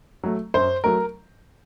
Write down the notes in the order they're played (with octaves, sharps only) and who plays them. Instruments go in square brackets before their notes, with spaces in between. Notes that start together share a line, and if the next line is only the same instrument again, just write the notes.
[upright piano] F#3 A3
F#2 C5
F#3 A3 A#4